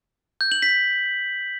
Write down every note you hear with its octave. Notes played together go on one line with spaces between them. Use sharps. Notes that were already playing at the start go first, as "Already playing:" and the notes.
G6
F#7
B6